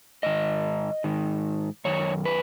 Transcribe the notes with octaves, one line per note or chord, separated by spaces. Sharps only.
G#2 D#3 D#5
G#2 D#3
F#2 D#3 C#5
B4